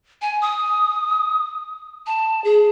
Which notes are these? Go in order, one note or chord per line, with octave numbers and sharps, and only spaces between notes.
G#5
D#6
A5
G#4